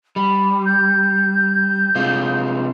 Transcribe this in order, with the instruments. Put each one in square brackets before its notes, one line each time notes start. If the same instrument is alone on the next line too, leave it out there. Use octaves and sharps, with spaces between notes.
[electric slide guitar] G3 [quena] B5
[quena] G6
[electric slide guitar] C3 G#3 F4